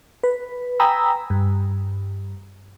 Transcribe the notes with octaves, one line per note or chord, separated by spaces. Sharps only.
B4
G5 G#5 A#5 B5 D#6 E6
G2